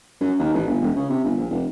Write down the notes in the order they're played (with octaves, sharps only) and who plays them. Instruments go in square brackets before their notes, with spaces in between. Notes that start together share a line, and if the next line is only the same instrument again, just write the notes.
[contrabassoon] F#2
D#2
A1
G1
E1
C#3
C3
G1
A#1
F1